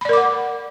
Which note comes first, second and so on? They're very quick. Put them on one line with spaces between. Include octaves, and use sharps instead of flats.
B5 D5 A#4 D6 F#5